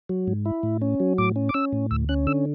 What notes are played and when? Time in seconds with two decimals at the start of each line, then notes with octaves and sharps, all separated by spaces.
0.09 F#3
0.28 G#2
0.45 E4
0.63 A2
0.82 C#4
1.00 F#3
1.18 A2 D6
1.36 C#4
1.49 D6
1.54 C#4 E6
1.73 A2
1.91 D2 E6
2.09 C#4 F#6
2.27 D3 E6